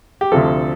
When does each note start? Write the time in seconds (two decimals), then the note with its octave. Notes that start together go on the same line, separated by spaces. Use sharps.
0.21 G4
0.32 D2 C3 F3 A4